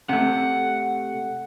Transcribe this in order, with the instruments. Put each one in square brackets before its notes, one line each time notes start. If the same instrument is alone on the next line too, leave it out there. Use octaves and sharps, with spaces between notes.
[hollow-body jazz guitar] C3 A3 [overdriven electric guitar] F#5